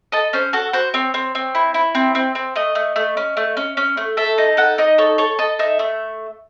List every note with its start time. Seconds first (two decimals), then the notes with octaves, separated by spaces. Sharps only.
0.12 A4 D#5
0.33 C#4 C5
0.53 F#4 A4
0.73 F#4 C5
0.94 C4 C#5
1.14 C4
1.35 C4
1.55 E4
1.74 E4
1.95 C4
2.15 C4
2.35 C4
2.56 A3 D#5
2.75 A3
2.96 A3
3.17 C#4
3.37 A3
3.57 C#4
3.77 C#4
3.97 A3
4.17 A4 E5
4.38 D#4
4.57 A4 F#5
4.78 D#4 D#5
4.98 A4 C#5
5.18 A4 C#5
5.39 A4 D#5
5.59 D#4 E5
5.79 A3